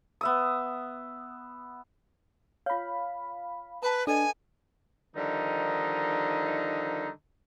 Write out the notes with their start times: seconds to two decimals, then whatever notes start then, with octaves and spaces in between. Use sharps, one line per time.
0.21 B3 E5 D#6
2.66 F4 C#5 F5 B5
3.82 B4 A5 A#5
4.07 D4 A4 B4 D#5 G#5
5.16 D3 D#3 F3 G3 D#4